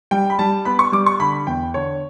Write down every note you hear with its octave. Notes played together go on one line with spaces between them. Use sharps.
G3 G5
B5
G3 A5
B3 B5
C#6
G3 D6
C#6
D3 B5
E2 G5
D3 C#5